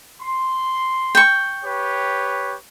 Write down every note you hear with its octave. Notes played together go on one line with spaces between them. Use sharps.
C6
G5 C#6
G4 B4 C#5